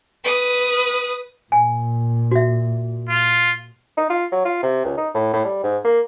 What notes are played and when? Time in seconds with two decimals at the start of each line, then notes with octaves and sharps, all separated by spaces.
0.24 B4 D#6
1.52 A#2 G#5
2.31 F#4 E5
3.09 F4
3.97 D#4
4.10 F4
4.32 F#3
4.45 F4
4.63 C3
4.85 C#2
4.97 D#4
5.14 A2
5.33 A2
5.45 G3
5.64 G#2
5.85 A#3